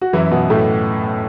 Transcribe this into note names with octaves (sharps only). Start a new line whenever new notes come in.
F#4
F#2 E3 E4
B2 B3
A2 A3